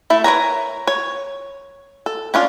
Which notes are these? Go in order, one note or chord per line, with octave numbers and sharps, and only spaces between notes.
A3 E4
A#4 B4 C#5 A#5
C#5
A4
C#4 D4 F4